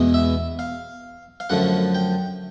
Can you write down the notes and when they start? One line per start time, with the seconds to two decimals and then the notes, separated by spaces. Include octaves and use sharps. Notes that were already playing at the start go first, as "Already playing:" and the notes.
Already playing: E2 B2 G#3 B3 E4
0.14 E5
0.59 F5
1.40 F5
1.50 F#2 D3 F3 A3 F#5
1.95 G5